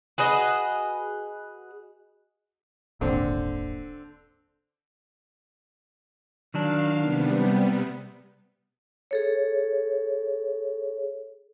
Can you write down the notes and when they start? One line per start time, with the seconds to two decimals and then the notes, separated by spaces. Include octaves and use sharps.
0.18 F#4 G#4 B4 D#5
3.01 D#1 G#1 A#2 D3 C4
6.54 D#3 F#3 D4 F5
7.03 C3 G3 B3
9.11 G#4 A4 C#5